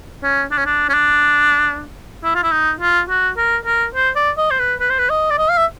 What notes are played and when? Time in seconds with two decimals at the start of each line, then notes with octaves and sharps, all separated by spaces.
0.23 C#4
0.51 D4
0.58 C#4
0.66 D4
0.89 C#4
0.94 D4
2.24 E4
2.35 F4
2.43 E4
2.52 D#4
2.80 F4
3.09 F#4
3.37 A#4
3.66 A#4
3.95 C5
4.16 D5
4.37 D#5
4.51 C5
4.59 B4
4.80 B4
4.90 C5
4.99 B4
5.09 D#5
5.30 D5
5.38 D#5
5.50 F5
5.58 E5